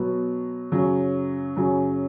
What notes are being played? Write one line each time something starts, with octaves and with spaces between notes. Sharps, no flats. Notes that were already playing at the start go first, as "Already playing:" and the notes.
Already playing: B2 F#3 B3
F#2 C#3 F#3
F#2 C#3 F#3